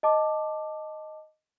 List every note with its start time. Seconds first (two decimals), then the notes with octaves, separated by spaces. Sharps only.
0.03 D#5 A5 D6